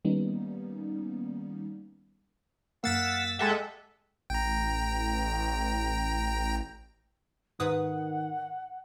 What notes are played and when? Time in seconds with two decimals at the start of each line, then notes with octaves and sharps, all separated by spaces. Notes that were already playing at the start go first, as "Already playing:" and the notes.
0.05 D#3 G3 A#3 B3 C#4 D#4
2.84 F#2 A#3 F5 F#5 E6 A6 B6
3.39 G#3 G4 A4 E5 F#5
4.30 A1 G5 A#5
7.60 G#2 D#3 B4 F#5 D#6